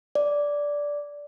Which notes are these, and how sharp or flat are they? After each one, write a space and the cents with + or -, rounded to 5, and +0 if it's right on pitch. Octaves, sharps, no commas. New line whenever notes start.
D5 -10